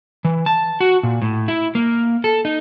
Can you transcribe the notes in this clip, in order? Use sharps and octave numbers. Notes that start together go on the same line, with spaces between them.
E3
A5
F#4
A#2
A2
E4
A#3
A4
D#4